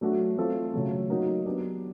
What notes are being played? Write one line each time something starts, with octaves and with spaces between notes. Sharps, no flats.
F#3 A3 D4 F#4
A3 C4 F4 A4
C#3 F#3 A3
F#3 A#3 D#4 F#4 A#4
F#3 B3 D4 G4